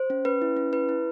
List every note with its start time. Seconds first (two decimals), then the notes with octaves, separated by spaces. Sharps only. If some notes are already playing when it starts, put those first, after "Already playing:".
Already playing: C5
0.10 C#4
0.25 C#4 B4
0.42 E4
0.56 C#4
0.72 E4 B4
0.89 E4